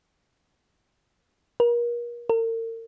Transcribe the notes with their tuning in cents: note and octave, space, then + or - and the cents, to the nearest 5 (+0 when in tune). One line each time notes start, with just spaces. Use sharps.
A#4 +35
A#4 -40